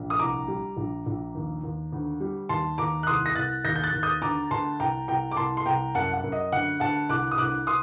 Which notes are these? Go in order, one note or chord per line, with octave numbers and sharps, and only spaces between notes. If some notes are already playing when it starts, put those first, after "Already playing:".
Already playing: A#1
D#6
C2 A#5 D6
G3
A#1
A#1
D#2
D#2
D2
G3
D#2 A5 C6
D#2 A#5 D6
F#6
C2 C6 D#6
A#6
C2 F#6 A6
D#2 G6 A#6
G6
F#6 A6
D#2
D#6 G6
D2 A#5 D6
D2 A5 C6
C2 G5 A#5
C2 G5 A#5
D6
C2 A5 C6
C6
C2 G5 A#5
F#2 F#5 A5
F#5
F#2
D#5
D2 F#5
D2 F#5 A5
C2 D6 F#6
D#6
C2 D6 F#6
C6 D#6